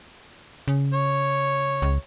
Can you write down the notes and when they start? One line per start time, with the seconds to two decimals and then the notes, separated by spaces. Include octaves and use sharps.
0.68 C#3
0.94 C#5
1.82 C#2